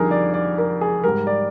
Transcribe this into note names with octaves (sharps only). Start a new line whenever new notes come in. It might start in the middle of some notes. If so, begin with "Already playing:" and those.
Already playing: F2 D3 G3 D#4 G#4 A#4
D5
D5
A#4
G#4
G#2 G3 A#4
D5